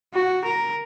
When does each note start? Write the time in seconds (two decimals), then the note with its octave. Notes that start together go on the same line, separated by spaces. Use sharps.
0.14 F#4
0.45 A#4